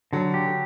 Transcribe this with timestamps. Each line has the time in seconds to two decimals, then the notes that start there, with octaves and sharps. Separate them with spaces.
0.13 D3 F#3
0.34 G4